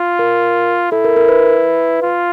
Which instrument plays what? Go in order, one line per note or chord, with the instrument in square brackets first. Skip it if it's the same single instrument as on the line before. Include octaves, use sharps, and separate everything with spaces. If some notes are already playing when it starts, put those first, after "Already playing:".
Already playing: [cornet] F4
[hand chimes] A#4
[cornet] E4 [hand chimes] A4
[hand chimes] A#4
A#4
B4
[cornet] F4